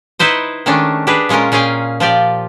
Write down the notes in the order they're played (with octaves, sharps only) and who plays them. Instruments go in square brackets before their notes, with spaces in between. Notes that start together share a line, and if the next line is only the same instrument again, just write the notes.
[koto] D#4 E4 B4 C5 D#5
D#3 G#3 A3 C#4 D4
D4 G4 G#4 B4
A#2 G#3 C#4 F4 A#4
A#2 C#4 G#4 F5 G5
F3 F4 G4 D5